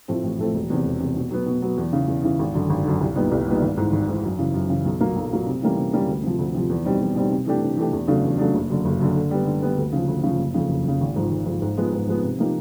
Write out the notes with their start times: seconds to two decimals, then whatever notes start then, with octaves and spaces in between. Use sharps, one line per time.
0.08 A2 F3 A3 C4
0.23 A1
0.39 A2 F3 A3 C4
0.54 E1
0.70 E2 C3
0.85 E1
1.00 E2 C3
1.16 B2
1.31 F#3 B3
1.46 B2
1.62 F#3 B3
1.77 E2
1.93 C#3 E3
2.08 E2
2.24 C#3 E3
2.39 G#1
2.54 F#2 D3
2.70 G#1
2.85 F#2 D3
3.00 C2
3.16 A#2 G3 B3 D#4
3.31 C2
3.46 A#2 G3 B3 D#4
3.62 G#1
3.77 G#2 E3
3.92 G#1
4.08 G#2 E3
4.24 F#2
4.39 C#3 E3
4.54 F#2
4.69 C#3 E3
4.85 B1
5.00 A#2 F#3 A#3
5.16 B1
5.31 A#2 F#3 A#3
5.47 C3
5.62 E3 G3 A#3 C#4
5.77 C3
5.93 E3 G3 A#3 C#4
6.08 D2
6.23 C3 F3
6.39 D2
6.54 C3 F3
6.70 E2
6.85 B2 G3 C4 D#4
7.01 E2
7.15 B2 G3 C4 D#4
7.31 C3
7.46 E3 A3 D4 G4
7.62 C3
7.77 E3 A3 D4 G4
7.92 E2
8.07 C#3 F#3 A3 D4
8.23 E2
8.38 C#3 F#3 A3 D4
8.54 F#1
8.69 F#2 D3
8.85 F#1
9.00 F#2 D3
9.15 D3
9.31 G3 B3
9.46 D3
9.62 G3 B3
9.77 D2
9.93 C#3 F3
10.08 D2
10.23 C#3 F3
10.38 F#1
10.54 F2 C#3
10.69 F#1
10.84 F2 C#3
11.01 G#1
11.16 G#2 F3
11.31 G#1
11.46 G#2 F3
11.62 G#2
11.77 F3 G#3 B3
11.93 G#2
12.08 F3 G#3 B3
12.23 C3
12.39 F3 A#3 D#4 G4